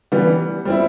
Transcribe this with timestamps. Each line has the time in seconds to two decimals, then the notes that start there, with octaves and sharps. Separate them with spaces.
0.12 E3 G3 B3
0.65 G3 C4 E4